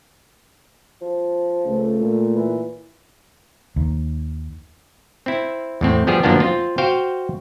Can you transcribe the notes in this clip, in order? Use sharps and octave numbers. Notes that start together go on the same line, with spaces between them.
F3
C#2 A3
A#2
E3
D#2
C4 E4
E2 A2 C4
F3 G3 B3 G4 G#4
F#2 D#3 F3 A#3 B3 D4
C4 F4
F#4 C5 F5 G5